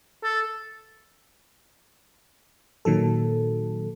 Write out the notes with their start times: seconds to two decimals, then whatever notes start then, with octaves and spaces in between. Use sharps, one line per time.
0.23 A4
2.85 A#2 D#3 F#3 A4